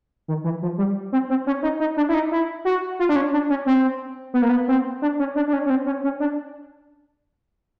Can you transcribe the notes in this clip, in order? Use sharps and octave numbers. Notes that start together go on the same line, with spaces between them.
D#3
E3
F3
G3
C4
C4
C#4
D#4
D#4
D4
E4
D#4
E4
F#4
F4
D4
C#4
D4
C#4
C4
B3
A#3
B3
C4
D4
C#4
D4
D4
C#4
C#4
C4
C#4
C#4
D4